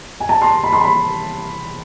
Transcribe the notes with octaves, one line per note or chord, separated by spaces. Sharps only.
G#5
A5
C6
B5
C6
B5